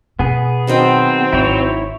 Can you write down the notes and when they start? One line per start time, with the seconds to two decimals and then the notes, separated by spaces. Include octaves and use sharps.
0.19 B2 B3 G#4
0.67 D#3 F#3 C4 F#4
1.33 G#1 E4 C#5